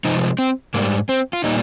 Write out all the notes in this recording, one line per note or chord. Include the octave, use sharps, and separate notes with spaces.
C3 F3 G#3 D#4
C4
G#2 G3 A#3
C4
F4
A#2 G3 D#4